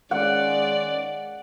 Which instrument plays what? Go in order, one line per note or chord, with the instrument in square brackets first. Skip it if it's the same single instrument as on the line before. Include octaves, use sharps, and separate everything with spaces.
[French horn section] D#3 G#3 C#4 [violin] D5 [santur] F#5